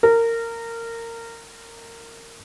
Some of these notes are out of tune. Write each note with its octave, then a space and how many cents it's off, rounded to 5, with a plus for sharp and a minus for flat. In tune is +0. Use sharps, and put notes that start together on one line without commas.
A#4 -20